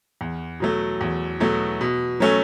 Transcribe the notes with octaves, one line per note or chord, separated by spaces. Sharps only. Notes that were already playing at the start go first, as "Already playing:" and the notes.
E2
B2 F#3 A3
E2
B2 F#3 A3
B2
F#3 A3 C#4